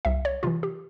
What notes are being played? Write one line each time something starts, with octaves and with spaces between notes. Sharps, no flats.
C2 E5
C#5
C3 E3 F4
G4